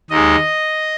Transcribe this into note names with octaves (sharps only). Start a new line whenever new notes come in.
D#2 D#3 G#3 D#5